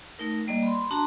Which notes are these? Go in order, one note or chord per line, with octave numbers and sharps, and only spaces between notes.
A3 D#4 A#4
G3 A#3 D5 D#5
B5 C6
D4 F#4 A5 A#5 C6